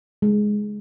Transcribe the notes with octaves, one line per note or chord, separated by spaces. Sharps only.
G#3